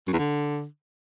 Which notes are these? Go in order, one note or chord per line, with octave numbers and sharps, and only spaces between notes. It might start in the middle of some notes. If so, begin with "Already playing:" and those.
F#2
E2
D3